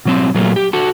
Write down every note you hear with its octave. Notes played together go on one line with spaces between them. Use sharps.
B2 F#3 C4
A#2 F#3 A3 A#3
G4
F#4 A4